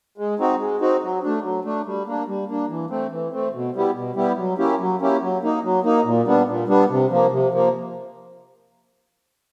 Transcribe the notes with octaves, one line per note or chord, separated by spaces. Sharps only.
G#3
C4 D#4 F#4
G#3
C4 D#4 F#4
F#3
A3 D4
F#3
A3 D4
G3
A#3 D4
G3
A#3 D4
E3
A3 C4
E3
A3 C4
B2
G3 B3 E4 G4
B2
G3 B3 E4 G4
F#3
A#3 C#4 E4 G4
F#3
A#3 C#4 E4 G4
F#3
A#3 D#4
F#3
A#3 D#4
A#2
G3 B3 D4
A#2
G3 B3 D4
C3
F3 A#3
C3
F3 A#3